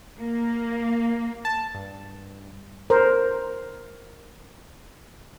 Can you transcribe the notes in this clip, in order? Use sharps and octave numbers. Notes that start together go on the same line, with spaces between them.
A#3
A5
G2
A#4 C5